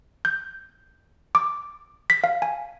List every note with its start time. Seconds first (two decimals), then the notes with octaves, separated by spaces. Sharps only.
0.25 G6
1.35 D6
2.10 B6
2.24 F5
2.42 G#5